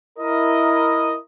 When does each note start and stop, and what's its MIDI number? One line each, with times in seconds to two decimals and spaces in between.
0.19 1.16 64
0.19 1.16 70
0.19 1.16 75